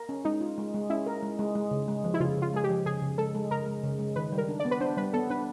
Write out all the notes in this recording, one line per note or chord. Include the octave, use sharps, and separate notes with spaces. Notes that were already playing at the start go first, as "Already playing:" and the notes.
Already playing: A#4
C#4
G#3 D#4
F4
G#3
G#3
C#4 E4
A#4
G#3
G#3
G#3
C#3
G#3
F3
E4
C#3 F4
C#3
F4
G#3 G#4
G4
F3
C#3 G#4
C#3
G#3 A4
G#3
C#3 A#4
G#3
C#3
G#3
D#3 B4
G3
A#4
D4
D5
B3
B4
D4 C5
G3 B4
B3 A4
D4 B4